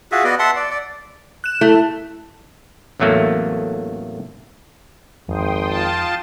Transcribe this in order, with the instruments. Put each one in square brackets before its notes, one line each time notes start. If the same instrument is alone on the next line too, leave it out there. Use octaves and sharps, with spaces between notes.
[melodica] F4 F#4 G#4 E5
B3 F#4 D5 D#5
E5 F#5 A5 C6
D5
D5
[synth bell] F#6 E7
[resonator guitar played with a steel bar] A3 [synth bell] E4
[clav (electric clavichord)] A1 E2 F#3 A3 A#3 C#4
[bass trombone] G#1 [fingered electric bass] F2 [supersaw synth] G5 C6 D#6
[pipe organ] F4 A5